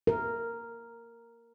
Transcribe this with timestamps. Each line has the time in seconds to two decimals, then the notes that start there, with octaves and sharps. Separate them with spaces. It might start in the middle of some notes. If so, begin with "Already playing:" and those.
0.07 A#4